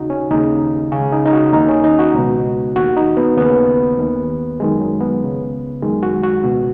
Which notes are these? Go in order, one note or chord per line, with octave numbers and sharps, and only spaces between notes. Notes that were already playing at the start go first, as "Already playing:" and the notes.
Already playing: D#2 C#3 D#4 F#4
C#4
D#2 C#3 D#4
C#2 C#3 C#4
D#4
D#4
F#4
D#2 D#3 D#4
C#4
D#4
F#4
C#2 B2
D#2 D#3 F#4
D#4
B3
D#2 C#3 B3
D#2 D#3
F#2 D#3 G#3
F#3
B3
C#2 C#3
F#2 D#3 G#3
F#4
F#4
C#2 B2